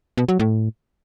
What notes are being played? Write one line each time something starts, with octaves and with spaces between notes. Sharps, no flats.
B2
F#3
A2